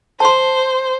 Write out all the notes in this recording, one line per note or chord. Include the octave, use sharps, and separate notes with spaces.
C5 A5 C6